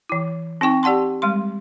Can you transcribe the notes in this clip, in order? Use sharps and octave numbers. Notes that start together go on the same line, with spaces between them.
E3 E4
C4 D#4 G5 C#6
G4 D5 F#5 A5 C6
G3 G#3 C6